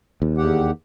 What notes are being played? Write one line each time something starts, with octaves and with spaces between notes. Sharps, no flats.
D#2
E2 G4 F#5